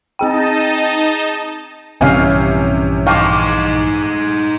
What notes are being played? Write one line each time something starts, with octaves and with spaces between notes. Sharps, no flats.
C4 D#4 G#4 D#5 G5 A5
A#1 G2 C3 E3 C#4 F5 G#5
D#4 C5 F5 G5 A5 C#6 D6